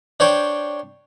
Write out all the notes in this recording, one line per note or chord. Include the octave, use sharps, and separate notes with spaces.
D4 C5 C#5 G5